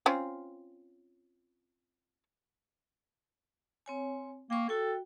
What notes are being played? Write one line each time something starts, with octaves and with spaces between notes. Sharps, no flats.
C4 C#4 F4
C4 C#5 G#5
A#3 G5 C#6
F#4 A4 G5